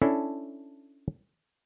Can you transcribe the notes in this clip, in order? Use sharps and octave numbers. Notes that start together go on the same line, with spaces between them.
C#4 D4 E4 A4